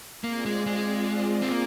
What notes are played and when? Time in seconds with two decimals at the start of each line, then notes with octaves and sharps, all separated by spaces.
0.24 A#3 C4 F4 G#4 D5
0.46 G#3
0.66 G#3
1.42 C4
1.51 A#3